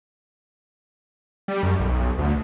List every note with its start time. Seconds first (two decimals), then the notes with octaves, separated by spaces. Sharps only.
1.48 G3
1.63 F#2
1.80 B1
2.19 D2